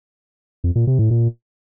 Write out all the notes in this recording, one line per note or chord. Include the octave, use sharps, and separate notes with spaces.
F2
A#2
C3
A2
A#2